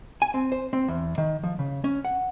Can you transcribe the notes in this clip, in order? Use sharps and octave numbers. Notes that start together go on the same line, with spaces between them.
G#5
C4
C5
C4
E2
D#3
F3
C#3
C#4
F#5